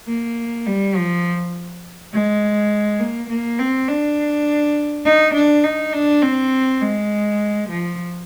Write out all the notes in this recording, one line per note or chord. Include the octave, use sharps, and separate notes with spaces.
A#3
G3
F3
G#3
A#3
A#3
C4
D4
D#4
D4
D#4
D4
C4
G#3
F3